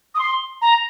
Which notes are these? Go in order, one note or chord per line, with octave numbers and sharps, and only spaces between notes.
D#6
C6
A#5